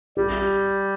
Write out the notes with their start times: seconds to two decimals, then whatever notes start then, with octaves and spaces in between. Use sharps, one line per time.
0.17 G3 G4